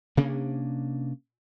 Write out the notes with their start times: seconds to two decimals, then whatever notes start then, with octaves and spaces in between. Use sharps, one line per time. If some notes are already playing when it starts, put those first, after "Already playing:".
0.17 C3 A#3 C#4 D4